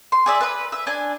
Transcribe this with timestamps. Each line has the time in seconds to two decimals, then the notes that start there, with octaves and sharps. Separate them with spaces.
0.12 C6
0.26 G#4 D5 E5
0.41 B4 B5
0.72 E5
0.87 D4 G#5